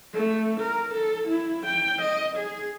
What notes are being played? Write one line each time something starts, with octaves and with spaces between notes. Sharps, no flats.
A3
A#4
A4
E4
G5
D#5
G#4